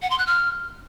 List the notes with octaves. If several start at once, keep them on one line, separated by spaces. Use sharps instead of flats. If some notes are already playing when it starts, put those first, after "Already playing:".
F#5
C6
F#6
F6